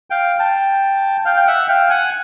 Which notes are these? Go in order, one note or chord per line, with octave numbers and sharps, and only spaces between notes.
F5 G5
G5 A5
F5 G5
G5
E5 F#5
F5 G5
F#5 G#5